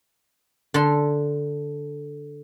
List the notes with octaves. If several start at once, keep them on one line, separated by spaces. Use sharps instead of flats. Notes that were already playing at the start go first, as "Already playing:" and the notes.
D3 A4 C6